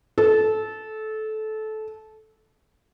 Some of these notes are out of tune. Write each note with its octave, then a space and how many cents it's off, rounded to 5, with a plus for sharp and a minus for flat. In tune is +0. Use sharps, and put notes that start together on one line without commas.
A4 -20